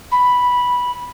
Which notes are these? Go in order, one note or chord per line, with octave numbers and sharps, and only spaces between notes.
B5